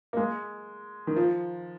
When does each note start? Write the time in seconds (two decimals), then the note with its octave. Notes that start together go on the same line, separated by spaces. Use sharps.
0.13 A#3
0.17 G#3
1.07 D#3
1.16 F3